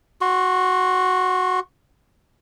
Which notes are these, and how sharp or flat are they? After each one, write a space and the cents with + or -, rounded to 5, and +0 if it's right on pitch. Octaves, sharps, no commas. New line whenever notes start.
F#4 +0 C6 +30